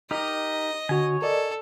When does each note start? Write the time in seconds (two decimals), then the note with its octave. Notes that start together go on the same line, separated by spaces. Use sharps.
0.11 D#4 G4 A#4 D#5
0.89 D3 F#4 C#5 G#5
1.22 A4 A#4 D5 D#5